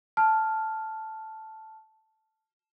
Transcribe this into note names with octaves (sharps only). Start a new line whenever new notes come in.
A5 F6